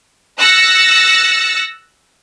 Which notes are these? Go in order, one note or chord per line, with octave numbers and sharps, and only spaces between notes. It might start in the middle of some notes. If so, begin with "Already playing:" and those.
E6 F#6 A6 A#6 C#7